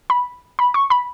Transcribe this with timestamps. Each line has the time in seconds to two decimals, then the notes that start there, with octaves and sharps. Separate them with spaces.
0.10 B5
0.59 B5
0.74 C#6
0.90 B5